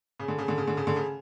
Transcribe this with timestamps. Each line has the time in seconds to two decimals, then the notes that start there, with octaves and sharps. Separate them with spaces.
0.19 C#3
0.28 D3
0.38 C#3
0.48 D3
0.58 C#3
0.67 D3
0.77 C#3
0.87 D3
0.96 C#3